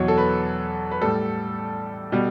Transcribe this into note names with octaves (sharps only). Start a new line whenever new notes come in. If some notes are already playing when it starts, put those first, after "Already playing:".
Already playing: E2 B2 F#3 C#5
A4
B4
B4
A2 G3 A4
B2 G3